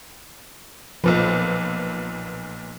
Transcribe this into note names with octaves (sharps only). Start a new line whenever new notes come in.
B1 A#2 F3 B4